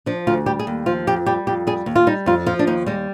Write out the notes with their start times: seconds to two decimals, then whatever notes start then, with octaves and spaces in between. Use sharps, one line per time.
0.06 F3 D4
0.27 D2 F4
0.46 G3 G4
0.59 G#4
0.67 D#2
0.86 F3 F4
1.07 F2 G4
1.26 G3 G4
1.47 F2 G4
1.67 G3 G#4
1.86 D#2
1.96 F4
2.07 G3 D#4
2.26 F2 F4
2.46 F3 F4
2.59 D4
2.67 D#2 D#4
2.86 G3 G#3